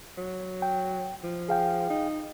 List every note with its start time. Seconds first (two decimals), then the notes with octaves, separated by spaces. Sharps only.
0.18 F#3
0.62 G5
1.24 F3
1.49 G#4 F5 G5
1.90 D#4